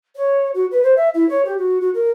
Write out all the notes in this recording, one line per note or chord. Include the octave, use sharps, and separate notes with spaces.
C#5
F#4
B4
C5
E5
E4
C#5
G4
F#4
F#4
A#4